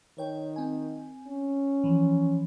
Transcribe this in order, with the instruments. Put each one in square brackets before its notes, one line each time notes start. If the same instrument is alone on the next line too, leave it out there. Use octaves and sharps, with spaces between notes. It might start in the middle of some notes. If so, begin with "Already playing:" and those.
[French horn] D#3 [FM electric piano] C#5 G5
[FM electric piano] C4 G#5
[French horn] C#4
[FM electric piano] E3 F3